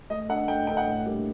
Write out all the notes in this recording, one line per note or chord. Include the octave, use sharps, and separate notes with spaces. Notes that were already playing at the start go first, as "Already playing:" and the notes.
A3 D#5
D4 A4 D#5 F#5
A3 G5
D4 A4 D#5 G5
F#5
A2
G3 A#3 D4